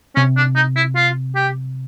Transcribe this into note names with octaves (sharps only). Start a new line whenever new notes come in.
C3 C#4
D4
D#4
E4
F4
G4